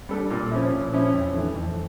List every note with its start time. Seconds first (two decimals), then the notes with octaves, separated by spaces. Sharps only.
0.09 G3 D4 A4
0.30 A#2
0.51 F3 C#4 E4
0.72 A#2
0.93 F3 C#4 E4
1.13 F2
1.34 E3 A3
1.55 F2